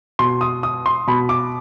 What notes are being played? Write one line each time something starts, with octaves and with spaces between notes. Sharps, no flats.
B2 C6
D#6
D#6
C6
B2 B5
D6